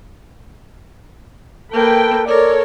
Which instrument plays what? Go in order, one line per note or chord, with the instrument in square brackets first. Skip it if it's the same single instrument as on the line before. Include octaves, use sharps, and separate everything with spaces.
[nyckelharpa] A#3 [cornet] A4 [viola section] B4 G5
[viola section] A4 C#5 [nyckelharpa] A#4 [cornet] D5